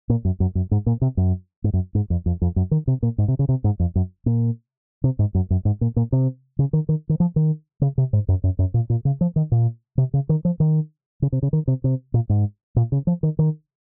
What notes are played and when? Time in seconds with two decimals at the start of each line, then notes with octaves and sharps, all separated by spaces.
0.09 A#2
0.25 F#2
0.40 F#2
0.55 F#2
0.71 G#2
0.86 A#2
1.02 C3
1.17 F#2
1.64 G#2
1.73 F#2
1.95 G#2
2.10 F2
2.26 F2
2.42 F2
2.56 F#2
2.71 D#3
2.87 C3
3.03 A#2
3.18 G#2
3.28 C3
3.39 C#3
3.49 C3
3.64 G#2
3.80 F2
3.95 F#2
4.26 A#2
5.04 C3
5.19 G#2
5.35 F#2
5.50 F#2
5.65 G#2
5.81 A#2
5.96 A#2
6.12 C3
6.59 C#3
6.73 D#3
6.89 D#3
7.09 D#3
7.20 F3
7.36 D#3
7.81 C#3
7.98 C3
8.13 G#2
8.28 F#2
8.44 F#2
8.59 F#2
8.74 A#2
8.90 A#2
9.05 C#3
9.21 F3
9.36 D#3
9.52 A#2
9.98 C3
10.14 C#3
10.29 D#3
10.45 F3
10.60 D#3
11.22 C#3
11.32 C3
11.43 C#3
11.53 D#3
11.68 C3
11.84 C3
12.14 A#2
12.29 G#2
12.76 A#2
12.92 C#3
13.07 F3
13.23 D#3
13.39 D#3